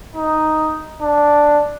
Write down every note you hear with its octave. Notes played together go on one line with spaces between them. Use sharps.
D#4
D4